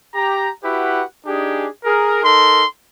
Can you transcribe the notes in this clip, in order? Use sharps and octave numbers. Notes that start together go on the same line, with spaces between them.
G4 A#5
E4 F#4 G4 B4 F#5
D4 D#4 G4 G#4
G#4 A#4
D#4 A4 A#4 C6